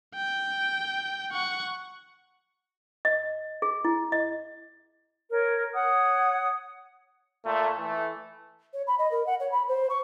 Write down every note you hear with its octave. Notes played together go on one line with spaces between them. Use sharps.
G5
F#5 C#6
D#5
G#4
E4
D#5
A#4 C#5
C#5 F#5 D#6
A#2 A3
E3 A3
C#5
B5
D#5
A#4
F#5
C#5
B5
C5
C#6